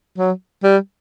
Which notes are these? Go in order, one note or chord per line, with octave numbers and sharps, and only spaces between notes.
F#3
G3